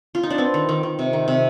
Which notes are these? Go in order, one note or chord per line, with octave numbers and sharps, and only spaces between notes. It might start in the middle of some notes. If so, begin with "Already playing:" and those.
F4
D#4
D4
B3 C4
D#3
D#3
D#3
C3
D#3
C3